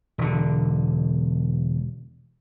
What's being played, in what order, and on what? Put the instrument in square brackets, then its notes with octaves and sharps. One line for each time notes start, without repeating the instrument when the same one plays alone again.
[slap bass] E1 D3